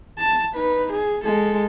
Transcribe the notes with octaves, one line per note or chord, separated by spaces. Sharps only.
A5
D#4 B4
G#4
G#3 A4